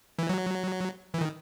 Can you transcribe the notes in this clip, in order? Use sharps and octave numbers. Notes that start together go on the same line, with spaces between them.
E3
F#3
E3
D#3